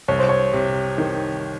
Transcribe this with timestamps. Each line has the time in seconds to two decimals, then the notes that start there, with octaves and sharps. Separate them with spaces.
0.08 C2 C#5
0.19 C5
0.29 C#5
0.53 C3
0.98 D#3